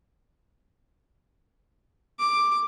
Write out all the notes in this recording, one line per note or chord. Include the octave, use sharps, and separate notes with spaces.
D6